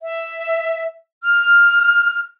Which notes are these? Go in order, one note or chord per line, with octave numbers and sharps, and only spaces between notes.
E5
F6